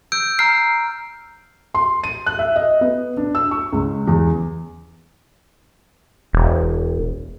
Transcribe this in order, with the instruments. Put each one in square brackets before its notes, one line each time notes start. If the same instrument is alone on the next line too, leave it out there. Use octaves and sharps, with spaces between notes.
[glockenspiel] E6 G6 D7
[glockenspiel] A#5 F6 [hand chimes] C7
[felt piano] C6
D#7
F#6
E5
D#5
B3
D4
E6
C#6
C#2
E2
[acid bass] E1